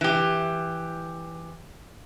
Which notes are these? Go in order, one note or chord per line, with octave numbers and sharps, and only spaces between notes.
E3 G4